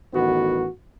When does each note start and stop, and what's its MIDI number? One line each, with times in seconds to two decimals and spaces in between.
0.13 0.67 33
0.13 0.67 51
0.13 0.67 59
0.13 0.67 66